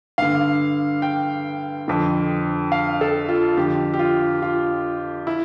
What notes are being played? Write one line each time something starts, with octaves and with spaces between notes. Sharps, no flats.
G2 D3 F5
G5
F2 D3
F5
A4
F4
F2 D3 G4
G4
F4
F4
E4